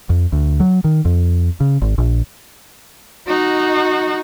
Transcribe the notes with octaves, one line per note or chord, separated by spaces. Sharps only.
F2
D2
F#3
D#3
F2
C#3
G#1
A#1
D#4 F#4